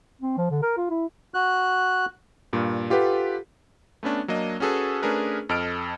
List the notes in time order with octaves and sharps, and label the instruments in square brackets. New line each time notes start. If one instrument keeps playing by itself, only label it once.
[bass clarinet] C4
F3
D3
A#4
F4
E4
[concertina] F#4 F#6
[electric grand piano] G2 A#2
F4 G4 A4 B4 F#5
A3 B3 C#4 D4
F#3 A#3 D4 D#5
C#4 F#4 G#4 A4 B4
A3 C#4 D4 G#4 A#4 B4
F2 A4 D#5 F6 D7